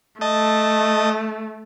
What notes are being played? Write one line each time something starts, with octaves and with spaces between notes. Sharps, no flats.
A3 D#5 A5